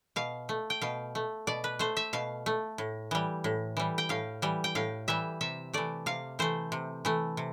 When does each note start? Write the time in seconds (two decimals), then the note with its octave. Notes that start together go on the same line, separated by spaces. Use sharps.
0.16 B2 F5
0.49 A3
0.70 G5
0.81 B2 F5
1.15 A3
1.47 B2 D5
1.64 B4
1.79 A3 C5
1.97 E5
2.13 B2 F5
2.46 A3
2.78 A2
3.11 E3 G3
3.44 A2
3.77 E3 G3
3.98 G5
4.09 A2 F5
4.42 E3 G3
4.64 G5
4.75 A2 F5
5.08 E3 G3 E5
5.41 C3 E5
5.73 E3 A3 D5
6.06 C3 F5
6.39 E3 A3 C5
6.72 C3
7.05 E3 A3
7.37 C3